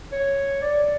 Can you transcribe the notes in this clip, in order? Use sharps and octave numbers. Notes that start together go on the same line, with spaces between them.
C#5
D5